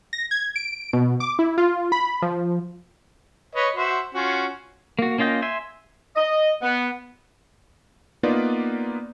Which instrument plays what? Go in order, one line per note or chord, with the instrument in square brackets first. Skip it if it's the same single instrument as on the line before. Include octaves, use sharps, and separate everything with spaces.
[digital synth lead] A#6
G#6
D7
B2
D6
E4
F4
B5
F3
[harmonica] B4 C#5 D#5
F#4 C5 E5
C#4 F4 F#4
[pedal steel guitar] A#3 F#4
A#3 C#4 F4 D#5 G5
E5 G#5 C6
[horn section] D#5
B3
[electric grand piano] A#3 B3 D#4 F4 B4 D5